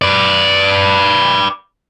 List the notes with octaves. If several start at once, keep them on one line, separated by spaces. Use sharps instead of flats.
B4 D5